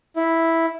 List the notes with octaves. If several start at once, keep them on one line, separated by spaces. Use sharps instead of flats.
E4